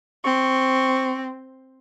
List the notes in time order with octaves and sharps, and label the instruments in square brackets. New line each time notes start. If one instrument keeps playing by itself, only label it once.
[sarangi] C4 [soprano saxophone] C#6